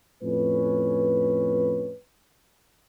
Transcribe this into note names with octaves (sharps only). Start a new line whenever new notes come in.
F2 A2 C#4 B4